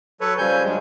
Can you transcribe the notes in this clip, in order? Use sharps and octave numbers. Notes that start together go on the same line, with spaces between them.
F#3 A4 B4 C#5
C#3 F3 G3 G#5 G6
G2 F#3 G#3